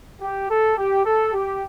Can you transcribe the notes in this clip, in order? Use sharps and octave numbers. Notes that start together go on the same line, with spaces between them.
G4
A4
G4
A4
G4